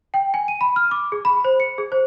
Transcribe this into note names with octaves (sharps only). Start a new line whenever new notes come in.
G5
G#5
D#7
B5
F6
D6
G#4
B5
C5
C#7
G#4
C5